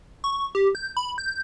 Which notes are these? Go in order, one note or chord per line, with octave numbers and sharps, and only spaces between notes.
C#6
G4
G6
B5
G6